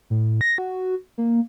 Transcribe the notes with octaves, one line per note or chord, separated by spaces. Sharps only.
A2
A#6
F#4
A#3